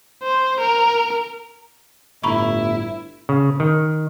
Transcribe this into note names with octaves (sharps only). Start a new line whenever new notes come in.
C5
A#4
G1 A2 E4 A#5 B5 C#6
C#3
D#3